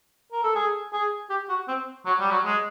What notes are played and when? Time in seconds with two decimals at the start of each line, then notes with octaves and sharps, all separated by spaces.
0.32 A#4
0.43 A4
0.55 G#4
0.93 G#4
1.30 G4
1.49 F#4
1.68 C4
2.06 F#3
2.19 G3
2.31 F#3
2.45 G#3